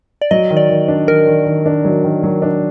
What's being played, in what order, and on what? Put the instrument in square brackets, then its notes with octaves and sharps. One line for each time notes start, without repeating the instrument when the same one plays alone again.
[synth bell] D5
[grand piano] F#3 [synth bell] D#5
[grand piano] D#3
[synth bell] D5
[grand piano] D#3
D4
[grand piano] D#3 [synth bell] A#4
[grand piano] D#3
D#3
D4
F#3
D#3
F#3
D4